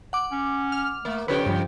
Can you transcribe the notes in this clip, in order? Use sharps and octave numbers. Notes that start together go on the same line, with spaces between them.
F#5 D6
C#4
F6
A3 A#3
F2 C#3 G4 B4 C#5
G2 F3